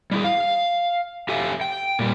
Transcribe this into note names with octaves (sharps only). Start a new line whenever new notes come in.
G3 E4 G#4
F5
G4 A4 E5 F5 G#5
G5
A#2 G3